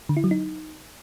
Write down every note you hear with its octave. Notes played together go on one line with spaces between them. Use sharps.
D3
E4
F#3
D#4